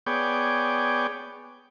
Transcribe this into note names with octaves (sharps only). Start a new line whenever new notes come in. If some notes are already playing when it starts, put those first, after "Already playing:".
B3 G#4 C#5 D5 G5